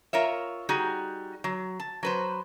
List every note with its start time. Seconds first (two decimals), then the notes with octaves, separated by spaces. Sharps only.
0.13 F4 A#4 C#5 E5
0.69 G3 D#4 F#4 G#4
1.44 F#3
1.80 A5
2.03 F#3 B4 C5